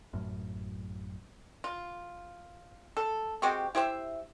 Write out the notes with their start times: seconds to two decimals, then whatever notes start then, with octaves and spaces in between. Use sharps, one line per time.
0.13 A1 F#2 A2
1.64 F4
2.97 A4
3.42 G#3 C4 F#4 G4
3.75 E4 G4 C5 E5